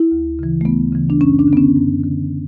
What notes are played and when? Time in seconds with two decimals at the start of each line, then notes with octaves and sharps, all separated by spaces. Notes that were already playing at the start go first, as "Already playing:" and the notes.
Already playing: E4
0.12 D2
0.39 C#3 E3
0.61 A3
0.65 D2 B3
0.93 C#3 E3
1.10 D4
1.21 F#2 C#4
1.39 D4
1.48 D3
1.53 B3
1.57 C#4
1.76 F#2
2.04 D3